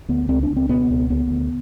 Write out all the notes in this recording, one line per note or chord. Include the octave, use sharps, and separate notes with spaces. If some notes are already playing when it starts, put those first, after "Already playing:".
D2 B3
C#2 C4
D4
C#2
C4
B2 B3
C#2
D2 B3
D2